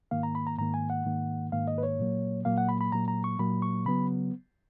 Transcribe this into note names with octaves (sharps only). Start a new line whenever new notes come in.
G#2 D#3 A#3 F5
A#5
B5
A#5
G#2 D#3 A#3 A#5
G#5
F#5
G#2 D#3 A#3
G#2 D#3 A#3 F5
D#5
B4
C#5
A#2 F#3 A#3
A#2 F#3 A#3 F5
F#5
B5
B5
A#2 F#3 A#3 A#5
A#5
C#6
A#2 F#3 A#3 B5
C#6
C#3 F#3 B3 B5